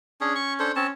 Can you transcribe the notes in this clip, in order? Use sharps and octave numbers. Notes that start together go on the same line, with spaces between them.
C#4 D4 G#4
C#6
D4 A4 C5
C4 C#4 A5